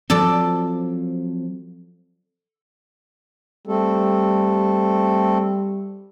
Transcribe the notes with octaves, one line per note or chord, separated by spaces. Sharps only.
F3 F#3 C4 A4 D5
G3 A3 C4 A4